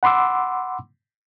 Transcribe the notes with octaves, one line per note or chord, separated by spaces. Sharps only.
F#5 B5 C6 D6 E6